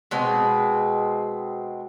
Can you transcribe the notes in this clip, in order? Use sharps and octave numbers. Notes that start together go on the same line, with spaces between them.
B2 G#3 C4